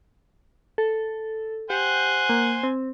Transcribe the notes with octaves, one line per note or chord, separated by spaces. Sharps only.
A4
G4 C5 F#5 G#5
A#3
C4